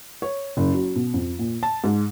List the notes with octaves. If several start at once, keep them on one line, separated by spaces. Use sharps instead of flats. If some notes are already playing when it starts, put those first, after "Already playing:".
C#5
F#1
F#3
B2
F2
A#2
A5
G#2